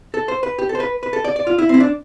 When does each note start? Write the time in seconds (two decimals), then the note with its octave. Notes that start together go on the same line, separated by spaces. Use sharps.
0.14 A4
0.28 C5
0.43 B4
0.59 G4
0.69 A4
0.75 C5
0.80 B4
1.03 B4
1.13 A4
1.24 D5
1.36 D5
1.47 F4
1.58 E4
1.69 C4 E4
1.80 D4